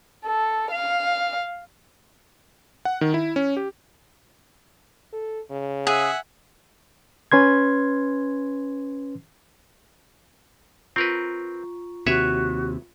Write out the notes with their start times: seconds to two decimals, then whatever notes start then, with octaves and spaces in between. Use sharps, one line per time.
0.24 A4
0.70 F5
2.85 F#5
3.01 D#3
3.14 E4
3.36 C#4
3.57 G4
5.12 A4
5.51 C#3
5.87 G#4 E5 F#5 G#5
7.32 C#4 B4 C6 G#6
10.96 C4 F4 A#4 B4 A#5 C#6
12.06 D#2 C3 F#4 B4 C#5 E5